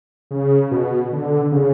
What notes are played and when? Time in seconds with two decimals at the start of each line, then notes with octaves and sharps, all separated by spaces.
0.31 C#3
0.71 B2
1.13 D3
1.52 C#3